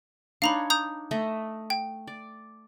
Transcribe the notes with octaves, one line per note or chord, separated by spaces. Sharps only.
D4 D#4 C#5 F5 A#5 B5
A#5 D#6 G6
A3 D#5 E5
G5
D5